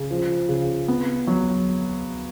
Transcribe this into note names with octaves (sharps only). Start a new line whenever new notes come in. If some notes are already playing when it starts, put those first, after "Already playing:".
Already playing: C#3
F3
C#3
B3
F#3